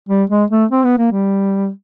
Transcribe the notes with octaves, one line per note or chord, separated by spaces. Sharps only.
G3
G#3
A3
C4
B3
A#3
G3